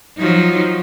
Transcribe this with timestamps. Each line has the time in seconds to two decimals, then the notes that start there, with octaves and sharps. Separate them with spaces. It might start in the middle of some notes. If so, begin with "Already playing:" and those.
0.17 F3 F#3 D#4